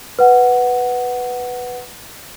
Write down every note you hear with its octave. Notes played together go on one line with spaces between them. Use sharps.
B4 F#5